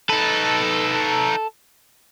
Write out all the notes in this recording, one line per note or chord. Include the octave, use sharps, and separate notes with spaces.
D#4 A4 B4